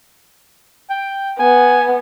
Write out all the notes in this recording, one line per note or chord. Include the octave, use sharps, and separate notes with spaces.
G5
B3 G#5